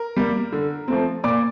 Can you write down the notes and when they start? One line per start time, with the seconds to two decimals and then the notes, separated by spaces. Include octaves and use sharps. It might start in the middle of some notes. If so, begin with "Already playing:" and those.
Already playing: A#4
0.17 G3 A#3
0.52 D3
0.88 F3 A3 C4
1.24 A#2 D5 D6